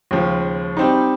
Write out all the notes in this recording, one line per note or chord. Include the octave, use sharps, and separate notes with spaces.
D#2 C#3 F3 G#3
G3 C4 D#4